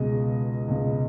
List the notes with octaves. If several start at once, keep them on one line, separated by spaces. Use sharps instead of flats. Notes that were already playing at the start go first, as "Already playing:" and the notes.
Already playing: C#2 B2 G#3 D#5
C#2 B2 G#3